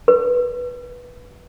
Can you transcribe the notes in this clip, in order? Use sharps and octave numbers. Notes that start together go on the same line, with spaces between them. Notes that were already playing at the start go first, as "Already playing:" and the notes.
B4